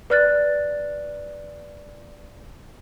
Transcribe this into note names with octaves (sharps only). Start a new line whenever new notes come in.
B4 D5 F6 F#6 A6